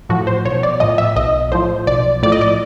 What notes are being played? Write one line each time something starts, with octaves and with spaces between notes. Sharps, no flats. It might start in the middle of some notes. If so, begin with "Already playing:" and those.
A2 F3 F#4
C5
B1 C#5
D5
A2 F3 D#5
E5
B1 D#5
A2 F3 C5
B1 D5
A2 F3 D5
D#5
D5